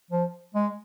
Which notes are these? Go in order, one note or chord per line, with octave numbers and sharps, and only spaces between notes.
F3
G#3